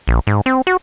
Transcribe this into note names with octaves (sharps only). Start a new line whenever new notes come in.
A#1
G#2
C4
F#4